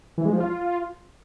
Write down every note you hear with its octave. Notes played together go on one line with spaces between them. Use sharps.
E3
G#3
F3
F4